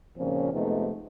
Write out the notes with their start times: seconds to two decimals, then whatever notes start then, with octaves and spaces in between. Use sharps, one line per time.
0.17 D#2 A#2 C#3 F3 C4 C#4
0.52 F2 C3 G#3 A3 B3 D#4